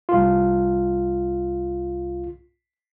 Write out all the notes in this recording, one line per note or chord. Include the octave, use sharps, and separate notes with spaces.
C2 F4